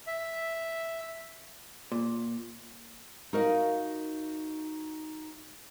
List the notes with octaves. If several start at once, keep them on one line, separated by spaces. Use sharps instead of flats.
E5
A#2
D#4 F#4 A#4 D#5 F5